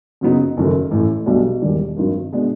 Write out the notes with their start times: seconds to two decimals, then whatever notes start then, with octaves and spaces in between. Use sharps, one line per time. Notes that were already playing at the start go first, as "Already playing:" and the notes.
0.21 F#2 C#3 F#3 B3 D#4
0.57 F#1 F#2 D#3 F#3 A3
0.91 A1 A2 E3 A3
1.26 B1 B2 G3 B3 D4
1.62 E1 D#2 D#3 G3
1.97 G#1 G2 D#3 F#3
2.32 B2 G#3 B3 D4